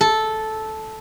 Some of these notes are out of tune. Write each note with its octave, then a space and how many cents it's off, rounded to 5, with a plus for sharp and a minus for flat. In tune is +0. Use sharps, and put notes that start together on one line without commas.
A4 -10